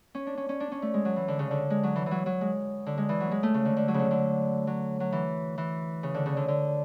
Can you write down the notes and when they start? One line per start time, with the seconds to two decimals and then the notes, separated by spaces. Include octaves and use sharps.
0.15 C#4
0.27 D4
0.37 C#4
0.49 C#4
0.60 D4
0.72 C#4
0.82 A3
0.94 G#3
1.05 F#3
1.16 E3
1.28 D3
1.39 C#3
1.51 D3
1.70 G#3
1.83 F#3
1.96 E3
2.06 E3
2.11 F#3
2.26 F#3
2.41 G#3
2.86 D3
2.98 G#3
3.09 E3
3.20 F#3
3.31 G#3
3.43 A3
3.54 C#3
3.65 D3
3.77 D3
3.88 F#3
3.94 C#3
3.99 D3
4.11 D3
4.67 F#3
5.00 F#3
5.12 E3
5.58 E3
6.03 C#3
6.14 D3
6.26 C#3
6.37 D3
6.48 D3